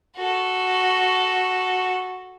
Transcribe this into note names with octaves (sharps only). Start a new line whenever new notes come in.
F#4 A4